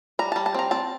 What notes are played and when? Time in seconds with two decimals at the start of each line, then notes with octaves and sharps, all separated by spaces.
0.19 G3 A#5
0.32 G3 A5
0.46 A5
0.54 C4 A#5
0.71 C4 A5